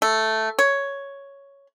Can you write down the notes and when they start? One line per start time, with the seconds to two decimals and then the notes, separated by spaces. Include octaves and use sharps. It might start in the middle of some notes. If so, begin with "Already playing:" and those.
0.02 A3
0.59 C#5